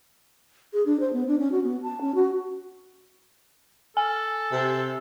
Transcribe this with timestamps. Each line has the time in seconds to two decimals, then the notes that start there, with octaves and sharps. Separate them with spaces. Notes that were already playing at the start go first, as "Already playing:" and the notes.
0.73 G#4
0.86 D4
1.00 C5
1.13 B3
1.27 D4
1.39 C#4
1.52 F#4
1.64 B3
1.83 A5
2.01 C#4
2.15 F#4
3.97 A4 G#5
4.52 C3